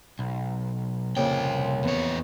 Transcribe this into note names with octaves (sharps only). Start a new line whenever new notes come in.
B1
C2 F2 A#2 C#3 G5
E2 B3 C#5